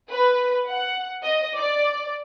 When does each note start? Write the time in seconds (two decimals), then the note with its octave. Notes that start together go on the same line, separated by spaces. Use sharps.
0.10 B4
0.69 F#5
1.23 D#5
1.56 D5